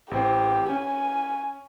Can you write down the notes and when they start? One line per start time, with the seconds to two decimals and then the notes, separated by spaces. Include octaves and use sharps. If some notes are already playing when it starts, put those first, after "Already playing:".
0.11 A1 C4 G4 C5
0.69 C#4 G#5